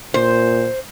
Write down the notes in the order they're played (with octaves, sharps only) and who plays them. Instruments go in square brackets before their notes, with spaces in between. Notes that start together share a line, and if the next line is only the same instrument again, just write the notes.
[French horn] A#2 [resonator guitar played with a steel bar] C5